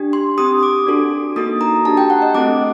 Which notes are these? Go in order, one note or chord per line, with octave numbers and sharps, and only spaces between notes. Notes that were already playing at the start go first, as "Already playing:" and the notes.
Already playing: D4 G4
C6
C4 G4 D#6
D6
D4 F#4 A4
A#3 D#4 F#4 A4 D#6
A#5
D4 G4 A5
G5
F#5
D#5
A3 C4 F#4 A4 D6